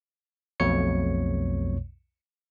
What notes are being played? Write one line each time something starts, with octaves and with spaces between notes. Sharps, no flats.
B1 F2 B2 A3 C#5 C#7